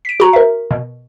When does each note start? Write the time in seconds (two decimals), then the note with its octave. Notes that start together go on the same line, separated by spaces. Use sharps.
0.05 B6 D7
0.20 F#4 A#5
0.33 A#4 E5
0.71 B2